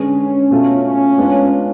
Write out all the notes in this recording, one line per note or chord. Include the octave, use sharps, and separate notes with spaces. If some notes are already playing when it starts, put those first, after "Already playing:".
Already playing: D3 G#3 C#4 D4 G#4 B4
B2 A3 F4 A4
C#4
G#3 B3 D4 F4